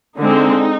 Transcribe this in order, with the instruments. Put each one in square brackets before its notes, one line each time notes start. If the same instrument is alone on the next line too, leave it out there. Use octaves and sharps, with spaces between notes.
[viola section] D3 G#3 C4 D#4